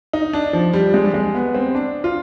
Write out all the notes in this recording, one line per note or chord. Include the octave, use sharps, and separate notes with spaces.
D#4
D4
F3
G3
G#3
G3
G#3
B3
C4
D4
F4